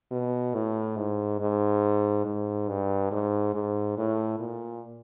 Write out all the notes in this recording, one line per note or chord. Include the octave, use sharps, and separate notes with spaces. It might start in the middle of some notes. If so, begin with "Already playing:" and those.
B2
A2
G#2
G#2
G#2
G2
G#2
G#2
A2
A#2